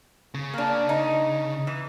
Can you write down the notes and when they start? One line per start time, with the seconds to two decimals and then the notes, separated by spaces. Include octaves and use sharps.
0.34 C#3
0.54 A#3 D4
0.89 D#4
1.67 E3